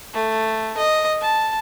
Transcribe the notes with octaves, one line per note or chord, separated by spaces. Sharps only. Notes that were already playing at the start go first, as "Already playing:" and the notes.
A3
D#5
A5